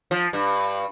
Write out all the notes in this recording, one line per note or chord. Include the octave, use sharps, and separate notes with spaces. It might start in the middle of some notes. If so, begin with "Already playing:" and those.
F3
G2